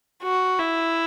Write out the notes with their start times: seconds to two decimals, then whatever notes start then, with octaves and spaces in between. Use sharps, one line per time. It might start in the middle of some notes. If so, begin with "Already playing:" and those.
0.23 F#4
0.59 E4